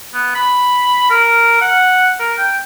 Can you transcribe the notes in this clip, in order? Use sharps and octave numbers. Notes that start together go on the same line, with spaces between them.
B3
B5
A#4
F#5
A#4
G5